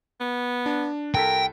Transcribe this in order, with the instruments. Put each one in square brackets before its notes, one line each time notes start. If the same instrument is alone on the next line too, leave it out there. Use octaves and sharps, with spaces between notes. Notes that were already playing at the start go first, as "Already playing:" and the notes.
[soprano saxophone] B3
[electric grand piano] D4
[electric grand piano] C2 A4 B6 [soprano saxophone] A#4 [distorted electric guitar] G5